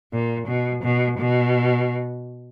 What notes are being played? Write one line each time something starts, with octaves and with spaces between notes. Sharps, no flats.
A#2
B2
B2
B2